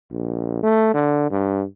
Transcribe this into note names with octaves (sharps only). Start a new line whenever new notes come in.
A#1
A3
D3
G2